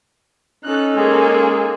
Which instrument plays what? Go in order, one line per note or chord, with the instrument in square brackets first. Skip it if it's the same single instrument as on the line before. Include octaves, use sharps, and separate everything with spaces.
[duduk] C#4 [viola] D#4 A4 [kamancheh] F#6
[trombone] G#3 [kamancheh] A#3 G#4